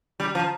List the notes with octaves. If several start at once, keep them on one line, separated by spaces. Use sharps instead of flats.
G3
F3